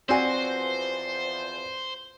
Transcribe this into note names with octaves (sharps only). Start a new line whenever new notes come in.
E2 F3 C4 F#4 C5 D5 G#5